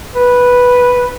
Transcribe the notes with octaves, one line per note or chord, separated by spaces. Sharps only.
B4